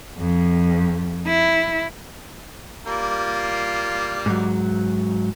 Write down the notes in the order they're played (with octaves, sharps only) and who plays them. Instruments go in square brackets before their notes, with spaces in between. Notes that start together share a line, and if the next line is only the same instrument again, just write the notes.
[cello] F2
E4
[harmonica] G3 A#3 F4
[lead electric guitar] G#2 F#3